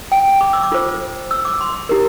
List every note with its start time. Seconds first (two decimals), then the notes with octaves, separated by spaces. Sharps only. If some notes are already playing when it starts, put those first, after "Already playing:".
0.12 G5
0.41 D6
0.53 E6
0.63 D6
0.72 F4 A4 C5
1.31 E6
1.45 D6
1.61 C6
1.89 E4 G4 A#4